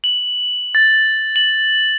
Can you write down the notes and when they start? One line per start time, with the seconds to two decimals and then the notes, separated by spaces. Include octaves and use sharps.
0.04 F#7
0.75 A6
1.36 F#7